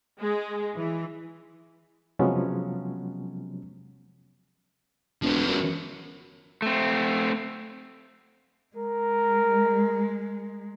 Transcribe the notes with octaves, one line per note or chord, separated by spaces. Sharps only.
G#3
E3
C3 F3 F#3 G#3 B3 C#4
E1 F3 B3
F#2
A3 C4
G#3 A#4